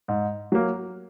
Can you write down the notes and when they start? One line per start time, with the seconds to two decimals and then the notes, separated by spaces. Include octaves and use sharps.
0.08 G#2
0.52 F#3 A#3